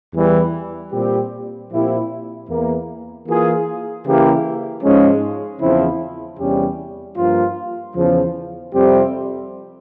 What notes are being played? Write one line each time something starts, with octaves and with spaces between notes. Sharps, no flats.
E2 E3 G3
A#2 G3 C4 G4
A#2 F3 C4 E4 G4
E2 E3 A#3
E3 A#3 F4 G#4
C#3 E3 A#3 E4 G4
G#2 F3 G#3 C#4
E2 C#3 F3 C4 E4
E2 C3 G3 C#4 G4
G2 F3 A#3 F4
E2 C#3 F3
F2 C3 G3 C4 G4